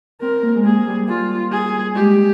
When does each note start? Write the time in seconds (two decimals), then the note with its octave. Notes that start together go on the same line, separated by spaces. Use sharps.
0.21 C4 A#4
0.42 A#3
0.55 G#3
0.64 A#3 G#4
0.87 G3
1.08 G3 F4
1.52 G#4
1.95 G#3 G4